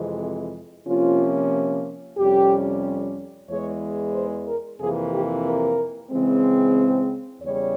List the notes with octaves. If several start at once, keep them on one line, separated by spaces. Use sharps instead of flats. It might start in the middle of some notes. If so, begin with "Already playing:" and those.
Already playing: F2 C3 E3 G#3
C3 F3 A#3 C#4 F4
F2 C3 G3 C#4 G4
E2 E3 G#3 C#5
C5
A#4
F2 C3 E3 A#3 G#4
G4
A#4
C#3 E3 G#3 C4
C5
E2 C#3 G3 C#5